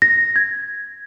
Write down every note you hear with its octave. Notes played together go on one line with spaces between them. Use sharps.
A#6
G#6